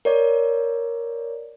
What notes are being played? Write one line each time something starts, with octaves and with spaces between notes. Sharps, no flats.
A#4 C#5 D5